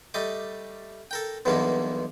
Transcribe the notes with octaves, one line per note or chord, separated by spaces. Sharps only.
G3 A3 D#5 D6
A4 A#4 G5
B1 E2 G2 B2 G#3 A#3